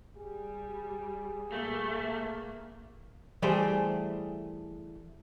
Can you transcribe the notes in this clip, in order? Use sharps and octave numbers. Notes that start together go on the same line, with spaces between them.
G3 G#4
A#2 A3 A#3
E3 G3 A3 G4 G#4 C5